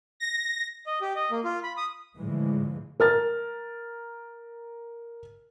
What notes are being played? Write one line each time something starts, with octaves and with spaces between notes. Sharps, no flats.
A#6
D#5
G4
D#5
A#3
F4
B5
D#6
A2 D3 E3 F3 G#3
A#4 F6 A6